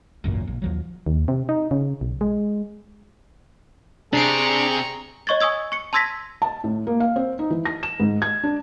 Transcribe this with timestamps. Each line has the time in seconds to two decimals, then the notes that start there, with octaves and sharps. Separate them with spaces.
0.24 G#1 C#2 F#2 A#2
0.47 A#1
0.62 D#2 F3 F#3
1.06 D#2
1.28 C3
1.49 D#4
1.71 C#3
2.01 B1
2.21 G#3
4.13 C3 C4 D4 G#4 A#5 C#6 C7 D7
5.27 C#5 D#5 C#6 G#6 A6
5.40 G#5 C#6 D#6 E6 G#6
5.72 C#6 C#7
5.93 A5 C6 E6 G#6 A#6 B6
6.42 A5
6.64 A2
6.87 A#3
7.00 F5
7.16 C4
7.39 D#4
7.50 E3
7.65 A#6
7.83 E7
8.00 G#2
8.22 G#6
8.44 D4